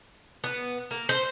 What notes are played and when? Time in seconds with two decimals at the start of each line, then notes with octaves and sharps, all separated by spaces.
0.44 B3
0.91 A#3
1.09 C5